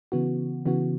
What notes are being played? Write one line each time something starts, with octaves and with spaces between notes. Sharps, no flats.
C#3 E3 B3 F#4
C#3 E3 B3 F#4